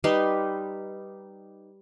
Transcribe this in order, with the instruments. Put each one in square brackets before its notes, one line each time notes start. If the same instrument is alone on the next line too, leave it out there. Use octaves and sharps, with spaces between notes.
[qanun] G3 D#4 B4 C6